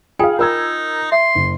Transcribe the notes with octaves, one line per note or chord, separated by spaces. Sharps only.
F4 G#4 F5 G5 G#5
D#4 F4 A#4 E6 G#6
E5 C6
F#1